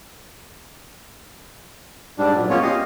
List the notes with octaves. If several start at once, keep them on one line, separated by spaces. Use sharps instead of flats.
G#2 G3 D4
A#2 F#3
G#3 A#3 B3 C#4 F4 C#5
G4 D#5 F5